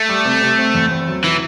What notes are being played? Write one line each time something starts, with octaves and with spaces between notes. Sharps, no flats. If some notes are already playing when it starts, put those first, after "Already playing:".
Already playing: A3
G3
C3
C3
C4
E2
C4
F#3
E3 E4